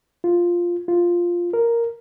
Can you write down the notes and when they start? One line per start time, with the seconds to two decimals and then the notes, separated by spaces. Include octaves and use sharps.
0.24 F4
0.88 F4
1.53 A#4